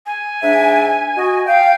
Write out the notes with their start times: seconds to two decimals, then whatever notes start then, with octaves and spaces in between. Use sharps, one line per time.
0.06 G#5
0.43 G#2 D4 E5
1.17 F#4 D#5
1.47 F5 G5